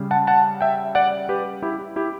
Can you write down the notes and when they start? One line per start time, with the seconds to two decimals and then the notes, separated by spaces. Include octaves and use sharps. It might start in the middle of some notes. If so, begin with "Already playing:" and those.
Already playing: C#3 G3
0.11 F#5 A5
0.27 F#5 A5
0.61 E5 G5
0.95 D5 F#5
1.29 G4 B4
1.62 E4 G4
1.96 E4 G4